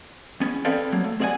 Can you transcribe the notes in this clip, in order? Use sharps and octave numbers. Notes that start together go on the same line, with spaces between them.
E2 B3 C#4
C4 G#4 A4 B4 D5 F5
F#3 A#3
A3
C4 G#4 D5 F5 F#5 G#5